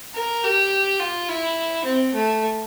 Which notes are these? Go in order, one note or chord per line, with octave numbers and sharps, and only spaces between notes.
A#4
G4
F4
E4
C4
A3